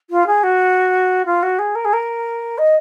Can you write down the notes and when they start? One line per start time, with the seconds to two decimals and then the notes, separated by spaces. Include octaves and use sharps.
0.10 F4
0.27 G#4
0.43 F#4
1.26 F4
1.43 F#4
1.59 G#4
1.75 A#4
1.85 G#4
1.93 A#4
2.58 D#5